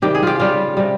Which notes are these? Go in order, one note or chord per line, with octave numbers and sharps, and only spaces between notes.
C3 D#3 G3 G4
G#4
F4 G4
C#3 G3 F4
C3 G3